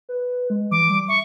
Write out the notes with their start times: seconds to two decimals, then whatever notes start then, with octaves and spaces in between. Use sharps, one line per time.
0.09 B4
0.50 G#3
0.71 E3 D6
0.90 G3
1.08 E5 C#6